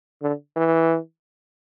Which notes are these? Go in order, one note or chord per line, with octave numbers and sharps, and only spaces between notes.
D3
E3